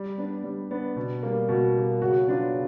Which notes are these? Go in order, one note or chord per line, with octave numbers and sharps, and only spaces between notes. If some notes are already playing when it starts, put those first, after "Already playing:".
Already playing: G3
B3 D4
G3
B3 D4
B2
G3 A#3
B2 F#4
G3 A#3
C#3 F#4
F#3 B3 D4 F4
C#3